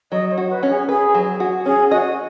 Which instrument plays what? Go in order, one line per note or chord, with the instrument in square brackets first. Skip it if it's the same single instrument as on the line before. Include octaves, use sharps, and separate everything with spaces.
[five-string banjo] F#3 [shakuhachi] D#5
[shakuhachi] C#5
[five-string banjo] F#4
[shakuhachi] B4
[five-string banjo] C#4
[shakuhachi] G#4
[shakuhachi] G#4 [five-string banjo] B4
[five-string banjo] F#3
F#4
[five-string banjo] C#4 [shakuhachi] G#4
[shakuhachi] F#4 [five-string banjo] D#5